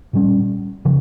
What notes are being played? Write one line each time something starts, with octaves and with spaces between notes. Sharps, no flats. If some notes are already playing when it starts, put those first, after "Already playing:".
A#2 G3 C#4
C#3 F3